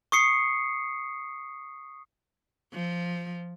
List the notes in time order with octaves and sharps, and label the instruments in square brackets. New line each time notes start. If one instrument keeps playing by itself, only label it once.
[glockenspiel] C#6 D#6 C7 C#7
[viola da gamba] F3